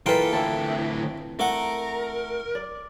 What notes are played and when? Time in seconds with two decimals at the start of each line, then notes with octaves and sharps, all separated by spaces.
0.06 E3 A#3 F4 A4 B4 G5
0.33 D2 C4 E4 A4
1.40 A3 A#4 F#5
2.55 D5